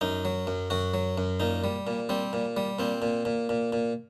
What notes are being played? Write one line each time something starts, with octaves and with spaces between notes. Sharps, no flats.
F#2 D#4
F#3
F#2
F#2 F#4
F#3
F#2
A#2 D#4
G3
A#2
G3 C4
A#2
G3
A#2 C4
A#2
A#2
A#2
A#2